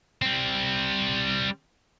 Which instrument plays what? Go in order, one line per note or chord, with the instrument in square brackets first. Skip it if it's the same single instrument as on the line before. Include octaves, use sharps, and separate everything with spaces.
[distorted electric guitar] G3 C4